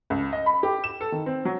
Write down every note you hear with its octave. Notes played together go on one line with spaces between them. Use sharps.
C#2
D#5
B5
G4
E7
A4
D#3
C4
F#3